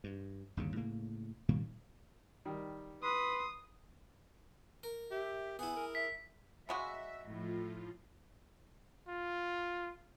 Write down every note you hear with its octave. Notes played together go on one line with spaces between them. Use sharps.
G2
G1 D#2 C#3
A2 C#3 A#3
A#2 D#3 G3 A#3
D#3 G3
B4 C6 D#6
A#4
G4 E5
B3 E4 G#4 G#5
A#4
E5 B6
C#3 G#3 F#4 E5
A2 F3 F4
F4